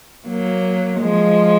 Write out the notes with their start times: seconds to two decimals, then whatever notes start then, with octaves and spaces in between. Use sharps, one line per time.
0.28 F#3 A#3
1.01 F3 G#3